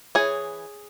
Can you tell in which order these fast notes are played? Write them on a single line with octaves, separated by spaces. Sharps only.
C#4 G#4 C#5 E3